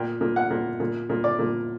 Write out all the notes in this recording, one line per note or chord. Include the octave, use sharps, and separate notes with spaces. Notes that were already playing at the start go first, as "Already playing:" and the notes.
Already playing: A#2 G5
A#2
F#5
A#2
A#2
A#2
D5
A#2